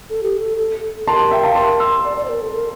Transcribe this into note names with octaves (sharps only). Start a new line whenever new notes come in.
A4
G4
A4
A4
A#4 A5 C6
E5 G5
F5 A5
A#4 A5 C6
C6 E6
D5
D5
C5
A#4
A4
A#4